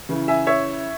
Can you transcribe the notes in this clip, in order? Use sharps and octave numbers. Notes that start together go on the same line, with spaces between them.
C#3 E3
E5 G#5
C#5 E5